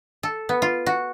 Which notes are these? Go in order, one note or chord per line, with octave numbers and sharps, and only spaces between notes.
A4
B3
F4
F#4